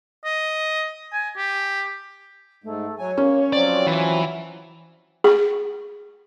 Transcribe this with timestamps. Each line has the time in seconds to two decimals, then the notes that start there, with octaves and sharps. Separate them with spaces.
0.25 D#5
1.13 G#5
1.37 G4
2.64 G#2 A3
2.99 F#3 C#5 G#5
3.17 A#3 C#4
3.53 F3 F#3 C4 D5
3.87 E3
5.24 G#4